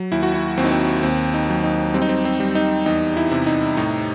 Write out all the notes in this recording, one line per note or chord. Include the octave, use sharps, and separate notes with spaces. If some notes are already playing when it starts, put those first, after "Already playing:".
Already playing: F#3
D#2 E4
F#4
E4
D#2 C4
D#4
C4
D#2 C4
D#4
F#3
D#4
G3 C4
D#4
C4
C4
G3
D#4
E2 D#4
E4
C3
D#4
A2 D#4